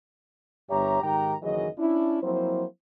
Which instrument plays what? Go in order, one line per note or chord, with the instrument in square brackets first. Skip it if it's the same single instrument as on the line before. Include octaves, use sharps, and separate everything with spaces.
[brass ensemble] G1 G2 G4 C#5 E5 A#5
G#2 D#3 G4 G5 A#5
F#1 D#3 E3 F#3 G#4 D#5
C#4 D4 E4
F3 F#3 A#3 C4 E4 C5